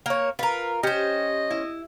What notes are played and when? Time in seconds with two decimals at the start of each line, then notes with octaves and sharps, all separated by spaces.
0.06 A#3 C#5
0.39 F4 A#4 B4
0.83 C#4 G4 C5 D#5
1.50 E4